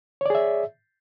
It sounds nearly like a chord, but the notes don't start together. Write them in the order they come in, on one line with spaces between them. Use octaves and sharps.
C#5 D5 G#4 E5